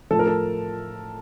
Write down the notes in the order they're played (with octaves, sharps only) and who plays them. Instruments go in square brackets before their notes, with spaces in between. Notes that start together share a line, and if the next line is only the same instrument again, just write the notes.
[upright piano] A2 F3 A4
A#4
A4